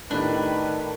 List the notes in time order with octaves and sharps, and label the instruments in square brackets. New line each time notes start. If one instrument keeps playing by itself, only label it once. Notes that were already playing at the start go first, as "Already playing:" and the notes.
[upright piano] A2 G4 F#6 [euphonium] D#3 [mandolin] D4 [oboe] B4